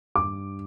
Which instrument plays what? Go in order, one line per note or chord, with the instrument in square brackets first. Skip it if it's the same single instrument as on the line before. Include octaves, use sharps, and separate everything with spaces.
[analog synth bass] G2 [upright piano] D6